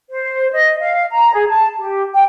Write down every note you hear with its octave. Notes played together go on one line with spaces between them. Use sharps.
C5
D#5
F5
A#5
G#4
A5
G4
G5